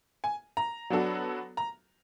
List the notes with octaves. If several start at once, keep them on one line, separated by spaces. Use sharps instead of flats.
G#5
A#5
F#3 B3 D4 F#4 A4
A#5